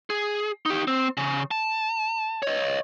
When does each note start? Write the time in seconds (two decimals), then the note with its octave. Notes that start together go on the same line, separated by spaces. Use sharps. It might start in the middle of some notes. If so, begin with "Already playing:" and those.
0.10 G#4
0.66 D#4 G4
0.88 C4
1.17 C#3
1.51 A5
2.42 C#5 D#5